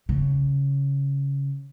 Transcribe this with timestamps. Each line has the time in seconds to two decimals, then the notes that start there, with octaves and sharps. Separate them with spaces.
0.09 C#3